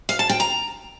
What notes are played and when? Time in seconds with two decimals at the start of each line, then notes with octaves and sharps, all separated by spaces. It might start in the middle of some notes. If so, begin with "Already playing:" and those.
0.09 F5
0.19 A5
0.29 G5
0.40 A#5